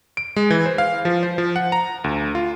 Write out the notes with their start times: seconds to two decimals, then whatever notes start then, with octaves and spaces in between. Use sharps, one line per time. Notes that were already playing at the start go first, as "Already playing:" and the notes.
0.17 D7
0.36 G#3
0.50 E3
0.66 C5
0.78 F5
1.05 F3
1.23 C5
1.38 F3
1.56 F#5
1.72 A#5
2.04 D2
2.35 F4